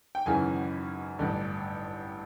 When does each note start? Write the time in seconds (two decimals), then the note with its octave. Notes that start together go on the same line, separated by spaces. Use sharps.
0.15 G5
0.26 G#1 F#2 C#3 E3 G#5
1.19 A1 G2 D3